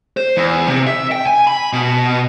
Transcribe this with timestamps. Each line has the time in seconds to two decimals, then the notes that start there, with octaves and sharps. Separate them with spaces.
0.17 C5
0.36 E2
0.69 C3
0.87 E5
1.12 G5
1.27 G#5
1.47 B5
1.73 B2